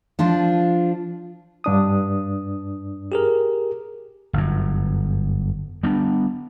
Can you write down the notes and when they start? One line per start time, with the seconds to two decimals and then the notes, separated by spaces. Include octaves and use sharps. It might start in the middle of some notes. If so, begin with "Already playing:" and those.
0.19 F3 D4 F4
1.64 G2 D4 D#6
3.12 G4 G#4 A#4
4.33 G1 F#2
5.83 G3 B3 D4